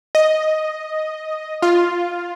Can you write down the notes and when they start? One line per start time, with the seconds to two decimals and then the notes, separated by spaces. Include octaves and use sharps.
0.15 D#5
1.62 F4